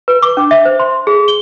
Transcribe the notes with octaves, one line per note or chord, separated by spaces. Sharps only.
B4
D6
D4
E5
C5
C6
G#4
G7